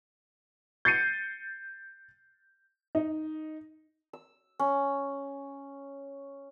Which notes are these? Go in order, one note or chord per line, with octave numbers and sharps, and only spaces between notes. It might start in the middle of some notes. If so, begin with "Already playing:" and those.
G6 A6 C7 C#7 D#7
D#4
E6
C#4